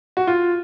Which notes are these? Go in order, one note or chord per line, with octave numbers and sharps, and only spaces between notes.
F#4
F4